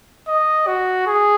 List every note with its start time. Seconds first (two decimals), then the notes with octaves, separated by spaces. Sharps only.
0.28 D#5
0.67 F#4
1.07 G#4